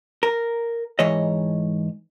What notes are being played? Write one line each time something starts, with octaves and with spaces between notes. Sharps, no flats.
A#4
G#2 E3 C#5 D#5